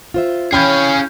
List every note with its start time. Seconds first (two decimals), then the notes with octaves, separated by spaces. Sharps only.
0.14 F4 C5 E5
0.52 E3 C#4 G#4 F5 G5 B5 G6